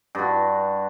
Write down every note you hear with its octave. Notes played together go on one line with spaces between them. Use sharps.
G2 F#4